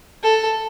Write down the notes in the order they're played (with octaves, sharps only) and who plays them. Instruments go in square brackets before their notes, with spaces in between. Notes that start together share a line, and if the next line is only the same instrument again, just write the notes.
[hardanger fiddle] A4